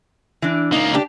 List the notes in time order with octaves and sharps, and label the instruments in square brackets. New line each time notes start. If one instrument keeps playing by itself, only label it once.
[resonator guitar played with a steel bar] E3 D4
[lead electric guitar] C#2 A#3 [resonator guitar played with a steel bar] D#4
[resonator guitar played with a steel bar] D4 G4